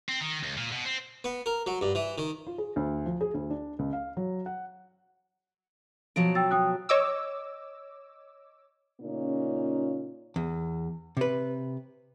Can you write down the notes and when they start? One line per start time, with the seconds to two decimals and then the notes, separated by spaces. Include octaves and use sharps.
0.09 C4
0.21 D#3
0.43 C#2
0.57 A#2
0.72 B2
0.85 C4
1.24 B3
1.46 A#4
1.67 F#3
1.81 G2
1.95 E3
2.18 D#3
2.47 F4
2.58 G#4
2.76 D2
3.06 F3
3.21 G#4
3.34 D2
3.50 D4
3.79 C#2
3.93 F5
4.17 F#3
4.46 F#5
6.16 B2 F3 F#3 D7
6.35 G5 E6 A6
6.51 G5 D#6 F#6
6.89 C#5 D#5 D6 E6
9.01 A#2 C#3 A#3 C#4 D#4 F4
10.36 E2
11.17 C3 B4